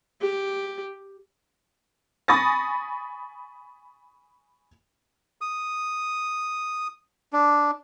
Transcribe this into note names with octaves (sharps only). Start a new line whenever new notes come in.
G4
G#5 B5 C#6 D#6 A6 A#6
D#6
D4